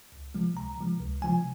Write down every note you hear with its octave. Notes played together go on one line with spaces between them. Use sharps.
C#2
C3 F3 G#3
C#2 A#5
C3 F3 G#3
C#2
C3 F3 G#3 G#5